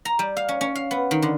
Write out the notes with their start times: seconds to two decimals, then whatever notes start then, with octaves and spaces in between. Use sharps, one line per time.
0.05 A#5
0.19 G3
0.37 F5
0.49 C#4
0.61 C#4
0.75 F5
0.91 B3
1.11 D#3
1.22 D3